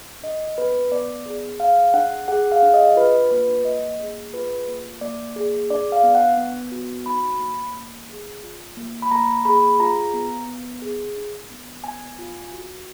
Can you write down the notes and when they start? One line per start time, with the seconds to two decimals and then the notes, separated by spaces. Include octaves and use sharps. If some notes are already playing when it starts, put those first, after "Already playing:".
0.23 D4 D#5
0.58 B3 B4
0.91 B3 D5
1.26 G#4
1.60 G#4 F5
1.94 D4 F#5
2.28 G#4 F#5
2.52 F5
2.62 D4
2.74 D#5
2.96 F4 B4
3.31 A#3 B4
3.64 A#3 D#5
3.99 G#4
4.33 F4 B4
4.68 A#3
5.01 A#3 D5
5.36 G#4
5.70 D4 D5
5.92 F5
6.03 B3
6.15 F#5
6.37 B3
6.72 F#4
7.06 D#4 B5
7.40 A#3
7.74 A#3
8.09 G#4
8.43 F4
8.77 A#3
9.02 B5
9.11 A#3 A#5
9.45 G#4 B5
9.80 F4 A#5
10.14 B3
10.47 B3
10.82 G#4
11.16 D4
11.50 B3
11.84 B3 G#5
12.19 F4
12.53 F#4